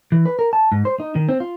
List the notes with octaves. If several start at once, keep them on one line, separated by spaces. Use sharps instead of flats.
E3
B4
A#4
A5
G#2
C5
D#4
D#3
C4
F4